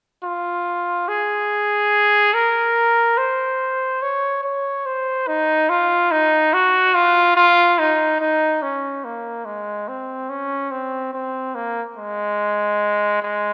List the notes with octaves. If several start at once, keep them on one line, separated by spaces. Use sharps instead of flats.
F4
G#4
A#4
C5
C#5
C#5
C5
D#4
F4
D#4
F#4
F4
F4
D#4
D#4
C#4
A#3
G#3
C4
C#4
C4
C4
A#3
G#3
G#3